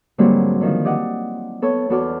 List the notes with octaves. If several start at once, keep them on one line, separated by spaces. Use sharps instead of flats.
G#2 D3 F#3 G3 A#3 C4
D3 D#3 F3
G4 D5 D#5 F#5
B3 A4 C#5
E2 B3 F#4 A4 D5 F6